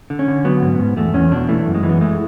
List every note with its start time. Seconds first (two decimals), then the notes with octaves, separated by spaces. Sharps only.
0.10 D3
0.19 C#4
0.28 D3
0.45 F#3 B3
0.62 G#2
0.79 G#2
0.97 E2 A3
1.14 E2 C#4
1.31 B2 D4
1.48 E3 A3
1.66 F#2
1.75 G#3
1.83 E3
1.89 B3
2.01 G#3 A3